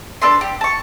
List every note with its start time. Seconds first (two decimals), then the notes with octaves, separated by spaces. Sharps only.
0.22 D4 A4 B4 C6
0.41 G4
0.61 A5 C#6